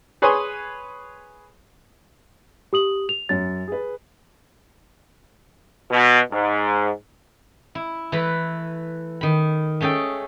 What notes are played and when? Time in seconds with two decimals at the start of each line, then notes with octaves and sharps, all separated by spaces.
0.22 G#4 B4 C#5 G#5 C6 D#6
2.73 G4 D#6 F#7
3.09 F7
3.29 F#2 C#4 A6
3.68 G#4 B4
5.90 B2
6.31 G#2
7.75 E4
8.12 E3 A3 B4 B5
9.21 D#3 B5
9.80 A3 C#4 G#4 A4 G5